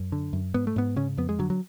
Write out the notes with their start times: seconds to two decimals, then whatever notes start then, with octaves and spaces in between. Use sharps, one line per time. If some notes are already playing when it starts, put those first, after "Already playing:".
Already playing: F#2
0.12 D3
0.33 F#2
0.54 G#2 B3
0.67 A3
0.76 G#2 B3
0.96 C#3 C#4
1.18 F2 B3
1.29 G#3
1.39 D3 F#3
1.50 F#3